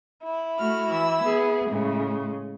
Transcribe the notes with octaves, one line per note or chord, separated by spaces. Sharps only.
E4
A3 F#4 F6
E3 E6
B3 G#4
A2 C#3 G#3